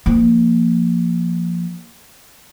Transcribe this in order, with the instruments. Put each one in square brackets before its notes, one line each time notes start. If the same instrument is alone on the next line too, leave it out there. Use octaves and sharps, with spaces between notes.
[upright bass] F3 A#3